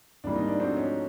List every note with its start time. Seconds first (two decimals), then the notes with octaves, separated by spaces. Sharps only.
0.24 G#1 G#2 E3 G3 A#3 D4
0.36 D#4
0.48 D4
0.59 G#2 F3 A3 C4 D4 F#4
0.77 C#4